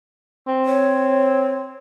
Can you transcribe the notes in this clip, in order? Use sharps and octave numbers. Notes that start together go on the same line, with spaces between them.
C4
C#5